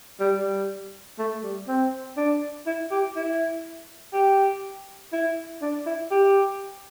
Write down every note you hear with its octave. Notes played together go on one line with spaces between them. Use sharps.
G3
G3
A3
G3
C4
D4
E4
G4
E4
G4
E4
D4
E4
G4